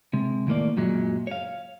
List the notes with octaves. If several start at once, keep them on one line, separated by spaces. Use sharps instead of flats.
C3 G#3
D#2 A2 A#3 D5
F#2 A#2 F#3 G#3
C#5 F5